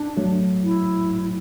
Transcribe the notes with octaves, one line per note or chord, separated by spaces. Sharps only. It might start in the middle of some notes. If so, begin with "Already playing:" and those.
Already playing: D4
F#3 A3
E4